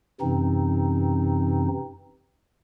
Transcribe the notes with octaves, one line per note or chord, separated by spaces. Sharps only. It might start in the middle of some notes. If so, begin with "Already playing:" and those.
F#2 C3 E3 C4 D#4